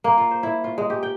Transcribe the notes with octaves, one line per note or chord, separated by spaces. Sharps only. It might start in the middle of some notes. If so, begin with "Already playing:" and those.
A#3
F4
C5
E4
F4
G#3
G4
G5